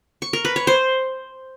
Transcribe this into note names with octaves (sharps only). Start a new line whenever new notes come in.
C#6
A#4
B4
C#5
C5